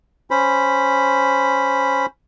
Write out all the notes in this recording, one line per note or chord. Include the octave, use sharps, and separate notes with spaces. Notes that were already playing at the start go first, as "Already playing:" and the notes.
C#4 C5 B5